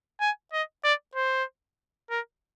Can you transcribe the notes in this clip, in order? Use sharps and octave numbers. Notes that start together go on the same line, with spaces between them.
G#5
D#5
D5
C5
A#4